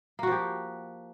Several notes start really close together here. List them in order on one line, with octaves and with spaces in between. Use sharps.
A#3 F#4 F3 G4